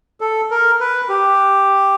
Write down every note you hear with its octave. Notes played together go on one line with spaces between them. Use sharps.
A4
A#4
B4
G4